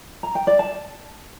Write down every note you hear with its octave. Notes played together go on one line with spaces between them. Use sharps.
A#5
G5
D5
A5